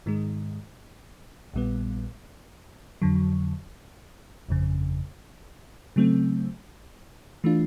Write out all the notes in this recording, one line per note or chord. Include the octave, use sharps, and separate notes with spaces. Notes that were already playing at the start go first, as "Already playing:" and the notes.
G#2 D#3 G#3
A#1 A#2 G3 B3
F2 D3 F#3
G1 F2 C#3
C#3 F#3 A3 C4
E3 A3 D4 F4